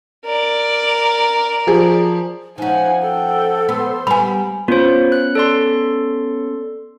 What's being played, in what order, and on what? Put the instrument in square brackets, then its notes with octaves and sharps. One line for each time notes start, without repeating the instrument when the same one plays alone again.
[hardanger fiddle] A#4 D5
[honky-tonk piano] F3 G#4
[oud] F3 C#4 [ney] D#4 [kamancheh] F#5 G#5
[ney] A4 [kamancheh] F#5 G5
[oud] B3 [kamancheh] C5
[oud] G3 B3 [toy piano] G#5 B5 [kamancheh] A#5
[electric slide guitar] B3 C#4 [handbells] F4 C5
[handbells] F#6
A4 D5 C6